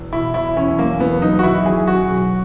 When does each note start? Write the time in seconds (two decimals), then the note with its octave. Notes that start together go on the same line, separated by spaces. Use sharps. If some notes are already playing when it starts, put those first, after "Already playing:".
Already playing: E1 E2
0.13 B2 E4
0.34 E1 E4
0.57 E2 C#4
0.78 F#3 A#3
1.00 E2 B3
1.22 F#3 D#4
1.39 F#4
1.43 D#3 E4
1.66 F#3 G#4
1.87 C#4 F#4
2.08 B2